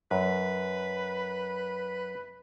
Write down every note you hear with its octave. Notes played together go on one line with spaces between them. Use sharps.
F#2 B4